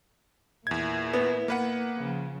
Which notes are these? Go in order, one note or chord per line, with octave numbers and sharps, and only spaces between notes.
E2 A#2 E4 G#6
B3
A#3 B4 F#5
C#3 F3